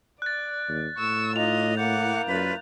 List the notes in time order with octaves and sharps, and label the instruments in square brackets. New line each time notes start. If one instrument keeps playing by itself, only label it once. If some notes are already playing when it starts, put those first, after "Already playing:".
[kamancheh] D5 [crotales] F#6 A6
[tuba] D#2
[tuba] A2 [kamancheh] C#6 E6
[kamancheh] D#4 F4 [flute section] D#5 D6 [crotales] F7
[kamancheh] A#3 E4 [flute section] F#5 D6 [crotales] G6
[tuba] F#2 [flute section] F4 B4 D5